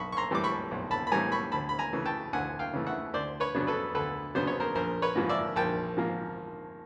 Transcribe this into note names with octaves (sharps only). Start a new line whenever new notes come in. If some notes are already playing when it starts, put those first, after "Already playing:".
Already playing: B1 B5 C#6
C#6
A#5 C6
A2 E3 G3 D6
B5 C#6
B1
A5 B5
B5
A2 E3 G3 G#5 A#5
B5 C#6
D2 A5 B5
B5
G#5 A#5
C#3 E3 A3
G5 A5
D2 F#5 G#5
F5 G5
C#3 E3 A3
E5 F#5
D2 C5 D5
B4 C#5
C#3 F#3 B3 D4
A4 B4
D2 A4 B4
C#3 F#3 B3 D4 C5
C#5
A#4 C5
A#1 A#4 C5
B4 C#5
G#2 F3 A#3
D5 E5
A#1 G5 A5
G#2 F3 A#3